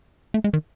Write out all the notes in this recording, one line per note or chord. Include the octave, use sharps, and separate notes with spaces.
A3
G#3
D#3